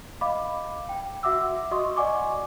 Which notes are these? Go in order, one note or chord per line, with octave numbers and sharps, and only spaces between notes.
D#5 F5 B5 D6
G5
F#4 E5 F#5 D6 E6
F#4 D#5 C6 C#6 D#6
D5 D#5 F#5 G#5 C#6 D6